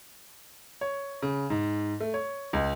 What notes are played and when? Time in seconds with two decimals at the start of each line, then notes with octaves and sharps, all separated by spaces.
0.81 C#5
1.22 C#3
1.50 G#2
2.01 A3
2.14 C#5
2.53 C#2